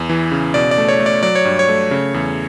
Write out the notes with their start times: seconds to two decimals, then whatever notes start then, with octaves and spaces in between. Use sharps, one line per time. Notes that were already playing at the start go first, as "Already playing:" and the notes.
Already playing: E2
0.10 E3
0.32 C#3
0.54 B2 D5
0.71 D5
0.78 A3
0.89 C#5
1.00 A3
1.06 D5
1.23 F#3 D5
1.35 C#5
1.45 G2
1.59 C#5
1.69 A3
1.91 C#3
2.14 E2